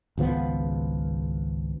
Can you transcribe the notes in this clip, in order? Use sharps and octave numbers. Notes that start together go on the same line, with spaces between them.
G#1 C#2 F3 B3